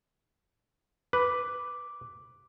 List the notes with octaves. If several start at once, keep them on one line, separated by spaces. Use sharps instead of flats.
B4 D6